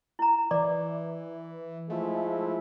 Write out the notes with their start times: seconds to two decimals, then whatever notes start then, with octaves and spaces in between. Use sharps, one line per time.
0.19 E4 A#5
0.51 E3 D5 D6
1.90 F3 G#3 A3 E4